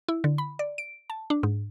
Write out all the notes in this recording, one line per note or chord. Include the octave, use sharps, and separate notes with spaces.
E4
D3
B5
D5
D7
A5
D4
G#2